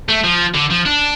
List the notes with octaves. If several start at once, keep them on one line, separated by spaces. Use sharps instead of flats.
A3
F3
D3
F3
D4